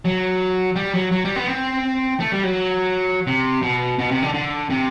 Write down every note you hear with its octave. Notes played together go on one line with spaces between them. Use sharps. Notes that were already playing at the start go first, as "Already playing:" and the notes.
F#3
G3
F#3
F#3
G3
B3
C4
A3
G3
F#3
C3
B2
B2
C3
D3
D3
C3